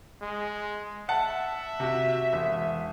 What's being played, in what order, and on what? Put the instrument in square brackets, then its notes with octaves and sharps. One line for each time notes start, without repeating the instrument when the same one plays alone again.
[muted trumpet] G#3
[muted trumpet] E5 [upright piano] F#5 A5
[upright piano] C3 F#4
E1